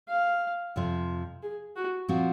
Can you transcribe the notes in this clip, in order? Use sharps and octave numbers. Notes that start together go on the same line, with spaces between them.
F5
F2 C3 F3
G#4
F#4
A#2 F3 C4 F#4